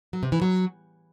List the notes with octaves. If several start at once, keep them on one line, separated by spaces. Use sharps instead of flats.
F#3
C3
E3
F#3